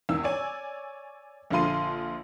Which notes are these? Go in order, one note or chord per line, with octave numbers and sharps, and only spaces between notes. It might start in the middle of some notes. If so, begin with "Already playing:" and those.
E2 D#3 E6
C#5 D5 G#5
A#1 D3 F3 F4 C6 D#7